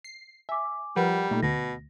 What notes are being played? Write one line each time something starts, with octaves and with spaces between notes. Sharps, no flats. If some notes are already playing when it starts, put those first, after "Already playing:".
C7
E5 G#5 D6
F3 G3 A#4 B4 F#5
A#2 A3 D#4
D2 B2 A#6